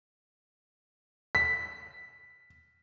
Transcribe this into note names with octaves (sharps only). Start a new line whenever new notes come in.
B6